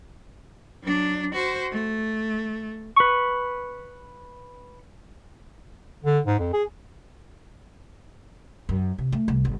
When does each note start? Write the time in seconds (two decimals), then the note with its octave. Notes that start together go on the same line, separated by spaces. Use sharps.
0.83 F#3 D4
1.34 F#4 C5
1.72 A3
2.96 B4 C#6
6.04 D3
6.26 G#2
6.39 F2
6.53 G#4
8.69 F#2
8.98 C3
9.12 A3
9.28 C2
9.45 G1